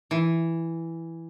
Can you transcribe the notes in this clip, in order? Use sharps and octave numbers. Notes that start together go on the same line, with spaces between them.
E3